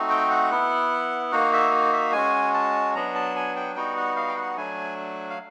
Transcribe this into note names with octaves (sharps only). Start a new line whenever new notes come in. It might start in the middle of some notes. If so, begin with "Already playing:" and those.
Already playing: A3 C4 D#4 F#4
G5
F#5
B3 E4
A#3 D#4 F#4 F#5
E5
E5
G#3 C#4 F#4 G#5
A5
F#3 B3 D4 A#5
A5
G#5
G5
G3 B3 D#4 F#4 G5
F#5
F5
G5
F#5
F#3 A3 D4 G#5
F5